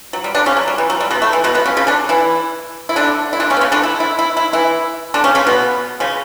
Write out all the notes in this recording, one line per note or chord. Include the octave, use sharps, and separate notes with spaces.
F#3
G3
D3 D4
C#3 C#4
F#3
G3
E3
F#3
G3
B2 B3
A3
E3
B2 B3
B2 B3
C#3 C#4
C#3 C#4
D3 D4
E3 E4
E4
D3 D4
E4
D3 D4
C#3 C#4
B3
C#3 C#4
D3 D4
E4
E4
E4
E4
E3 E4
D3 D4
C#3 C#4
C#3 C#4
B2 B3
C#3 C#4